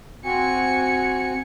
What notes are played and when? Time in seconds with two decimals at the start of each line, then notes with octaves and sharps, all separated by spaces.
0.25 C4 F#4 G#5 C#7